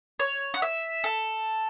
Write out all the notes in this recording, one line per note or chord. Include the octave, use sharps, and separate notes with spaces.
C#5
F#5
E5
A4